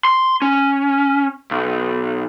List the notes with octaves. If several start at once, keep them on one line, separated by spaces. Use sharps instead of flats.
C6
C#4
B1